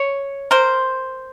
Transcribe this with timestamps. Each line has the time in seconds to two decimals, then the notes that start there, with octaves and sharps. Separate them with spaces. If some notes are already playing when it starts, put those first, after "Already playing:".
Already playing: C#5
0.51 A#4 C5